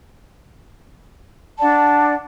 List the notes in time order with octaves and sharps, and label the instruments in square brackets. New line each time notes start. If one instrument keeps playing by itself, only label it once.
[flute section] D4 D5 F#5 A5